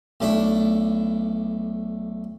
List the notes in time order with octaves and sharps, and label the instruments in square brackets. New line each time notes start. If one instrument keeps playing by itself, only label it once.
[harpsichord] B1 A3 D4 E4